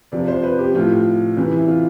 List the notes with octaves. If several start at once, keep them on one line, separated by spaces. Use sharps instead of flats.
C3 F3 D5
C5
B4
G4
A2 F3 F4
C3 E3 C4
E4
F4